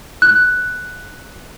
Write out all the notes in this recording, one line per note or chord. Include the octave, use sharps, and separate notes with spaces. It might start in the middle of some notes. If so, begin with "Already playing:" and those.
F#6